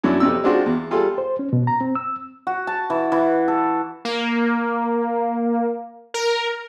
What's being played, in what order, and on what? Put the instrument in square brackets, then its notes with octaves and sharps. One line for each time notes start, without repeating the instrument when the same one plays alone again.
[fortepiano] F#2 F#3 C#4 D4 E4
F2 C3 E6
G#3 C4 D4 F4 F#4
E2
G3 F4 G#4 A4
[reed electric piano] C5
C#4
B2
A#5
C4
E6
[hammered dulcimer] F#4
A5
E3
E3
A4
[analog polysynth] A#3
A#4